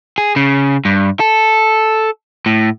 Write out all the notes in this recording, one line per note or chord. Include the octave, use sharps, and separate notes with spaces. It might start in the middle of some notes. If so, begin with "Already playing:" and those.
G#4
C#3
G2
A4
A2